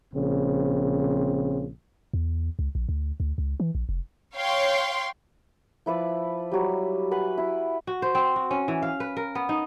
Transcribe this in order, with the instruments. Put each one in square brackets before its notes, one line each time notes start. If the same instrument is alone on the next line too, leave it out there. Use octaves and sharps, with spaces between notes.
[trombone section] A#1 C#3 C4
[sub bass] E2
C#2
A#1
D2
D2
C#2
E3
A#1
F1
[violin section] C#5 F5 G5 C6
[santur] F3 E4 B4 D5
F#3 G3
B4 F#5 G#5
E4
[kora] F#4
C5
C4
F#4
C#4
E3
F5
B4
A#4
B3
D#4